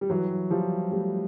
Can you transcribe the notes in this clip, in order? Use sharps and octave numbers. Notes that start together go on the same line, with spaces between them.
G3
E3 F#3
F3 G3
G3 A3